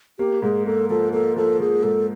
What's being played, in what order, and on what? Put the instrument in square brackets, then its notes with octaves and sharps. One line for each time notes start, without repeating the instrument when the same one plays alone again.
[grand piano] A#3 [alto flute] G4
[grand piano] G#2 [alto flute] G#4
[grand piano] A#3 [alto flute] A4
[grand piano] F3 [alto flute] A4
[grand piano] A#3 [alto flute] A4
[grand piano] F3 [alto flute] A4
[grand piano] F3 [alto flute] G#4
[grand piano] G#2 [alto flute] A4